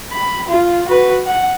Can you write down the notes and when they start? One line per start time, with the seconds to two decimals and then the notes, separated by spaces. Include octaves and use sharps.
0.12 B5
0.48 F4
0.88 F#4 B4
1.27 F#5